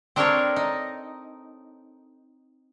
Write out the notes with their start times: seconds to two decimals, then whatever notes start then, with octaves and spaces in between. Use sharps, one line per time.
0.16 C4 D4 A4 A#4 C5 C#5
0.56 D#4